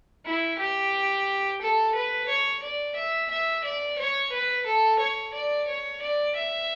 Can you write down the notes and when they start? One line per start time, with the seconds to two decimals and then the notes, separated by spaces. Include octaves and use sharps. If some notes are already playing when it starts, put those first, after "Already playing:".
0.26 E4
0.59 G4
1.62 A4
1.95 B4
2.29 C#5
2.63 D5
2.96 E5
3.31 E5
3.65 D5
3.99 C#5
4.32 B4
4.66 A4
5.00 C#5
5.34 D5
5.68 C#5
6.02 D5
6.36 E5